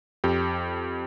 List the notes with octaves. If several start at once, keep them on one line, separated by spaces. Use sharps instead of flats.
F2 G4